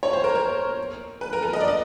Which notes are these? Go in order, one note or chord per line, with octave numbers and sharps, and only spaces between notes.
C#5
C5
A#4
A#4
B4
A#4
A4
D#5
D5
D#5